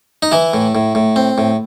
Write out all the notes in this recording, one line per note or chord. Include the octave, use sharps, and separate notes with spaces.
D#4
E3 E4
A2
A2
A2
C4
A2